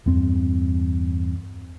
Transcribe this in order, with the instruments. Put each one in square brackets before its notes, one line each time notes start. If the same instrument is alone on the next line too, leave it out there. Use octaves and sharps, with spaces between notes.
[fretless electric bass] E2 G2 C4